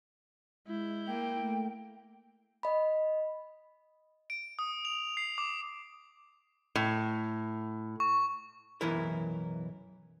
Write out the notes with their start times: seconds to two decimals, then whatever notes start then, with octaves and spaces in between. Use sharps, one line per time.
0.67 G#3 E4 G6
1.07 A#3 G5
1.40 A3
2.63 D#5 B5
4.30 D7
4.59 D#6
4.85 F7
5.17 C7
5.38 D6
6.75 A2
8.00 C#6
8.81 B1 F#2 E3 E4 A#4